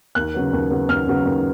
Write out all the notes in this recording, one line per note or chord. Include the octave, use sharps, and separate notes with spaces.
D#2 F#6
C#3 F#3 B3
D#2
C#3 F#3 B3
D#2 F6
C#3 F#3 B3
D#2